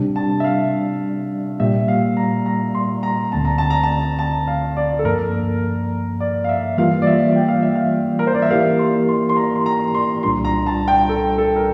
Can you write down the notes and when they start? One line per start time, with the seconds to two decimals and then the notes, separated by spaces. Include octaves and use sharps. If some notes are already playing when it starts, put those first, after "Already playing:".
Already playing: C3 G3 D4
0.16 A5
0.40 E5
0.44 F5
1.59 A#2 G3 A#3 E5
1.88 F5
2.17 A#5
2.46 A#5
2.75 C6
3.03 A#5
3.32 D2 D3 A3 C4 A5
3.45 A#5
3.58 A5
3.70 A#5
3.83 A5
4.19 A5
4.48 F5
4.77 D5
4.99 A4
5.04 G2 F3 A#3 A#4
6.20 D5
6.44 F5
6.49 E5
6.78 E3 G3 A#3 F4 F5
7.02 D5
7.07 E5
7.36 G5
7.48 F5
7.62 E5
7.75 F5
8.19 A#4
8.27 C5
8.34 D5
8.42 E5
8.51 E3 A#3 E4 G4 A#4 F5
8.79 C6
9.09 C6
9.29 C6
9.37 A#5
9.55 C6
9.66 A#5
9.95 C6
10.23 C2 A#2 G3 D4 F4 C6
10.45 A#5
10.67 A5
10.88 G5
11.09 A4
11.38 A4
11.56 A#4